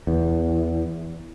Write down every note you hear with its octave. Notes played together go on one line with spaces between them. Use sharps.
E2